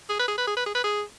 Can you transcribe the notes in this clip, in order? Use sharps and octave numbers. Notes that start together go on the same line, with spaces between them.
G#4
B4
G#4
B4
G#4
B4
G#4
B4
G#4